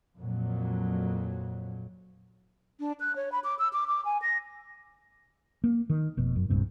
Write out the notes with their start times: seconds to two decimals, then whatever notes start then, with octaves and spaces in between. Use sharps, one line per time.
0.17 F2 A#2 F#3
2.80 D4
3.00 F#6
3.16 C#5
3.32 B5
3.44 D6
3.59 E6
3.73 D6
3.88 D6
4.05 G#5
4.22 A#6
5.64 A#3
5.90 D#3
6.17 F1 B2
6.36 F#2
6.50 D#1 C2 G2 C3